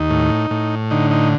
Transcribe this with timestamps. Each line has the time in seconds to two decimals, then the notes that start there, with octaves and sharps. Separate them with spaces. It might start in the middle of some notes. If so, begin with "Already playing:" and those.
Already playing: D#2 D#4
0.10 A2
0.51 A2
0.91 D3 D#4
1.11 D#4